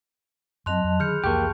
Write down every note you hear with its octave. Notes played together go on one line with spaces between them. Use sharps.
F#2 F#3 C4 D#5 A5 C6 F#6 F7
F2
D3 D#3 G#4 B5 F6 G6 C#7
C2 F2 E3 A#3 G4 A5 C#6 G6